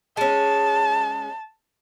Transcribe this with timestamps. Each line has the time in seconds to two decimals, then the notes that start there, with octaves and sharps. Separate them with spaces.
0.17 G#3 C#4 A5